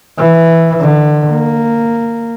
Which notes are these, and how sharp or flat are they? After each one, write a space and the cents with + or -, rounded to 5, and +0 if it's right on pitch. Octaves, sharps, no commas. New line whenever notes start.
E3 +0
D3 +30
A#3 -10